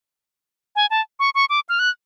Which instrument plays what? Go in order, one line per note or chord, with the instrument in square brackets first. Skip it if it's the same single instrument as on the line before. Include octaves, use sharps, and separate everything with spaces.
[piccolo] G#5
A5
C#6
C#6
D6
F6
F#6